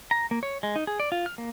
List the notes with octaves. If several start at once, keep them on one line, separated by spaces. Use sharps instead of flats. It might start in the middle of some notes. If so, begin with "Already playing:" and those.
A#5
A#3
C#5
G#3
D#4
G#4
D5
F4
F6
A#3